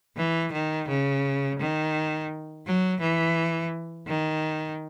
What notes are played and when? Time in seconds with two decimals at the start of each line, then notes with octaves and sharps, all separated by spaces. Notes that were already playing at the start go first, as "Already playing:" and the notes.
0.16 E3
0.52 D#3
0.88 C#3
1.59 D#3
2.66 F#3
3.00 E3
4.07 D#3